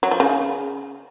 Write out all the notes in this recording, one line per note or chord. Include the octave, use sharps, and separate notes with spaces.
F#3
F3
C#3